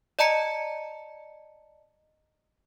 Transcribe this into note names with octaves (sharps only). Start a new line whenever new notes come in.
D5 D#5 A5 A#5 C#7